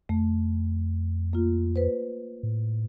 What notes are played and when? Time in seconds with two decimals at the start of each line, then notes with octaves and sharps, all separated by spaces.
0.09 F2 A3
1.33 A#3 F4
1.76 B4 C5
2.43 A2